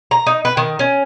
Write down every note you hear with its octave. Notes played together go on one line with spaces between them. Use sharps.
A#5
D#4
B4
D#3
C#4